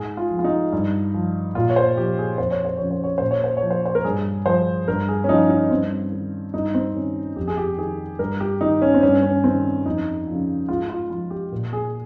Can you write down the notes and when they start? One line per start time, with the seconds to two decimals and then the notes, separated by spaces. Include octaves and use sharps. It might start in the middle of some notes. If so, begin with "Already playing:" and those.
Already playing: G#2 G#4
0.17 F4
0.30 F3
0.39 F4
0.44 D#4
0.72 G2
1.14 F3
1.55 A#2 F4
1.70 C#5
1.76 C5
1.97 F3 G4
2.18 G#4
2.38 F2 C5
2.51 C#5
2.65 C5
2.77 C#3 F3 C#5
2.91 C5
3.04 C#5
3.18 A#2 C5
3.31 C#5
3.44 C5
3.57 C#5
3.63 F3
3.70 C5
3.86 C5
3.95 A#4
4.04 G2 G#4
4.46 F3 C5
4.88 G2 A#4
5.08 G#4
5.24 C#4
5.29 F3 D#4
5.50 D#4
5.71 G2 C4
6.12 D#3
6.53 G2 D#4
6.74 C4
6.95 D#3 C#4
7.36 F2 G4
7.48 G#4
7.57 G4
7.78 D#3 G#4
8.19 G2 A#4
8.40 G4
8.61 D#3 D#4
8.82 C#4
8.94 C4
9.03 G2 C#4
9.23 C#4
9.44 D#3 C4
9.86 F2 D#4
10.27 C#3 F3
10.69 G#2 F4
10.89 F4
11.10 F3 F4
11.30 G4
11.52 A#2
11.73 G#4